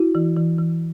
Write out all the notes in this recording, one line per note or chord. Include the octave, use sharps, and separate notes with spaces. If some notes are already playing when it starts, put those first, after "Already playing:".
Already playing: E4 F#4
E3
E3
E3